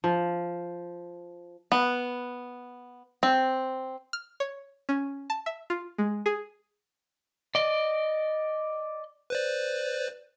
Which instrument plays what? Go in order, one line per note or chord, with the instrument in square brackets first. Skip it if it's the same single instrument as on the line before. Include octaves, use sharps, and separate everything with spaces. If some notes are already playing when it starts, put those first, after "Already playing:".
[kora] F3
[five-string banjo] B3
C4
[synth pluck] F6
C#5
C#4
A5
E5
F4
G#3
G#4
[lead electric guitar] D5 D#5
[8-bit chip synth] B4 C5 D5